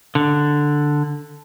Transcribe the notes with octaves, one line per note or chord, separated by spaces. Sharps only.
D3